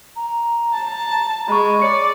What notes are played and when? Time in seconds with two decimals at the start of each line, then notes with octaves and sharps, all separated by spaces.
0.16 A#5
0.74 A5
1.48 G#3 D#5 B5 C#6
1.82 C#5 D5 C#7